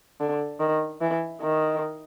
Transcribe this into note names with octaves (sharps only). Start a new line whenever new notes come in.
D3
D#3
E3
D#3